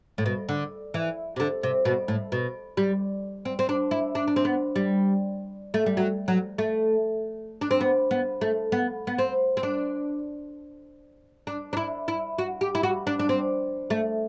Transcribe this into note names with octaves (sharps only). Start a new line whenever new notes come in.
A2
B2
D3
E3
C3
D3
C3
B2
A2
B2
G3
C4
C4
D4
E4
D4
D4
C4
B3
G3
A3
G3
F#3
F#3
A3
D4
C4
B3
B3
A3
B3
B3
C4
C4
D4
D4
D4
E4
E4
F#4
G4
E4
F#4
D4
D4
C4
A3